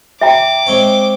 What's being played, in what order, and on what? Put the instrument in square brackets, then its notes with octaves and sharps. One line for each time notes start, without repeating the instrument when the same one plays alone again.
[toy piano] E5 G5 A#5 [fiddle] D6
[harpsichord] G#3 C4 C#5